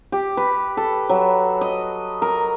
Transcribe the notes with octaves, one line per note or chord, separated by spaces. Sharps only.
G4
B4
A4
F#3
D#5
A#4